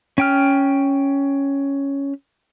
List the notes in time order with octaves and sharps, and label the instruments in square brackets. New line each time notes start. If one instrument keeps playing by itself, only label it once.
[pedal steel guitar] C#4 G5 F6